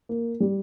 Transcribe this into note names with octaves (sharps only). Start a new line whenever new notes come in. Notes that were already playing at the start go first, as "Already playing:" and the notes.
A#3
G3